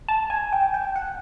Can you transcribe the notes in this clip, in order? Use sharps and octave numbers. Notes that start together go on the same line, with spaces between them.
A5
G#5
G5
G5
F#5